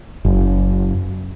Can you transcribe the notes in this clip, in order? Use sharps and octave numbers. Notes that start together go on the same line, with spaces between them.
F#1